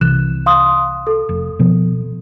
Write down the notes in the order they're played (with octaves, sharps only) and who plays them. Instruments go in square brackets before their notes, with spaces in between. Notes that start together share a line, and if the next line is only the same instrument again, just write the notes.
[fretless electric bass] C2 C3 E3 [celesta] F#6 E7
[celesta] F5 C6 D#6
A4
[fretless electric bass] F1
B2 F3 B3